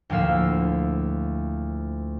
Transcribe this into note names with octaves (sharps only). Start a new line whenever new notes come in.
D2 A2 F3 A#3 F5 E6